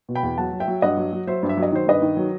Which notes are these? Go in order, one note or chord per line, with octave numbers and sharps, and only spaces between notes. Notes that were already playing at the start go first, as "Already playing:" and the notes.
B2
G5 B5
E2
F#3 F#5 A5
F#3
E5 G5
F#3
G2 D#5 F#5
F#3
F#3
F#3 C5 E5
G2
E5
F#3
D#5
D#3 C5
G2 B4 D#5
D#3
F#3